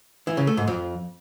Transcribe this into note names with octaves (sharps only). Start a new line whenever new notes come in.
E3
C#3
A3
G#2
F2